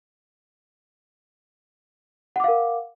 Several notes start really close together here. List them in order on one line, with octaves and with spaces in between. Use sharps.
F#5 D6 F5 A#4